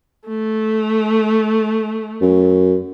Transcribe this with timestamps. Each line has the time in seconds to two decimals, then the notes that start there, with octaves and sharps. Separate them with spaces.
0.27 A3
2.21 F#2